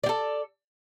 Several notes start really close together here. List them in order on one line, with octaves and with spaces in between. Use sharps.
D5 G4 A4